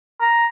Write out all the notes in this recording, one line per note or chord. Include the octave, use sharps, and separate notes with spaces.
A#5